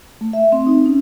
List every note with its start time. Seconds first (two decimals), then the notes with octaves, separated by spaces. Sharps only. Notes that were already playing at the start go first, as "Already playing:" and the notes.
0.21 A3
0.33 E5
0.52 C4
0.67 D#4
0.86 C#4